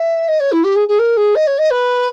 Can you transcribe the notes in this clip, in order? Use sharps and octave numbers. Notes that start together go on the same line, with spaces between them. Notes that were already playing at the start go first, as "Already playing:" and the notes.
Already playing: E5
D#5
C#5
E4
G4
G#4
G#4
A#4
G#4
D#5
C#5
D#5
B4